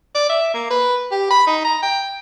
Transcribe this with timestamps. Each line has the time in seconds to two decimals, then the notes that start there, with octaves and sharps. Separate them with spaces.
0.15 D5
0.30 E5
0.54 A#3
0.70 B4
1.11 G4
1.30 B5
1.47 D#4
1.65 A#5
1.82 G5